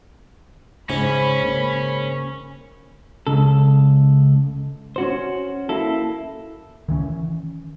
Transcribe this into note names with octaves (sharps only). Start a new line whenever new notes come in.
G#2 C#3 C#4 B5
C#3 A#3
C#2 C#3 A4
C#4 F#4 C5
A#3 E4 A4
D#3 E3 B3 C#4